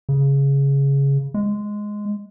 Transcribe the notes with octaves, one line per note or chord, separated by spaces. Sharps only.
C#3
G#3